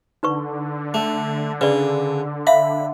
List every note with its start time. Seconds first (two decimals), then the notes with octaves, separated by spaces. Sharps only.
0.23 D3 D#4 B4 C#6
0.94 A3
1.61 C#3 B4 D5
2.47 E5 F5 B5